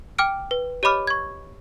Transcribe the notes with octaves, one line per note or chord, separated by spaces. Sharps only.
G5 D6 F6 D7
B4
G4 C#5 D#5 B5 D6 F6
C#6 G#6